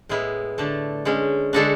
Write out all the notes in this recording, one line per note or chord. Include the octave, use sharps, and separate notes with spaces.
A2 G#3 B3 E4
D3 A3 D4
D3 G#3 C#4
D3 G#3 D4 F#4 A4